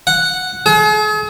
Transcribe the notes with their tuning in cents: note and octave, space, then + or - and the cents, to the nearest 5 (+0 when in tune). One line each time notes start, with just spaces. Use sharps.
F#5 -5
G#4 +40